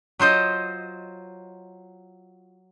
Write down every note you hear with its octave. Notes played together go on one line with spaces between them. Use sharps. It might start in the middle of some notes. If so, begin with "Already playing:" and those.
F#3 F4 C5 D#5